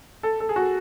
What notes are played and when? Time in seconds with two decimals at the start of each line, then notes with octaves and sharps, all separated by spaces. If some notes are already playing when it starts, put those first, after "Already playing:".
0.23 A4
0.40 A4
0.49 G#4
0.56 F#4